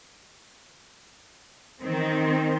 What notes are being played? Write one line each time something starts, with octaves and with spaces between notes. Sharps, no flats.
D#3 C4